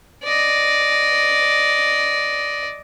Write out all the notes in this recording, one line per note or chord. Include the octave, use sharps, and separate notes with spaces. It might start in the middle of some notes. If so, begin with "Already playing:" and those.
D5 D#5